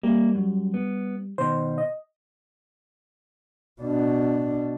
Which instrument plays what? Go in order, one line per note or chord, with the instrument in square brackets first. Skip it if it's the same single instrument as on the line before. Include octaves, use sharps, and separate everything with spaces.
[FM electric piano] G3 [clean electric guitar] A#3
[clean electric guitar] F#2
B3
[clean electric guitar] B2 D#3 [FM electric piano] C5
[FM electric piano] D#5
[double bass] B2 D4